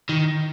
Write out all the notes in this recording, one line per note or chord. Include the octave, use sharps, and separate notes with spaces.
D#3